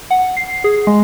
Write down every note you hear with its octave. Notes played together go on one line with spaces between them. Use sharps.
F#5
C7
G#4
G#3